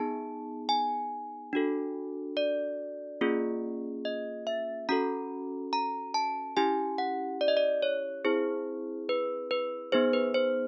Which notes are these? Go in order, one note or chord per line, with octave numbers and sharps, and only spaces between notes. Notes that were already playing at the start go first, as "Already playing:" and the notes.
Already playing: B3 D#4 G#4 A5
G#5
D4 F#4 A4
D5
A#3 C#4 F4 G#4
D#5
E5
C#4 F#4 A4 A#5
A#5
A5
C#4 E4 G4 G#5
F#5
D5
D#5
D5
C#5
C4 E4 G#4 C5
B4
B4
B3 D#4 G#4 C5
B4
C5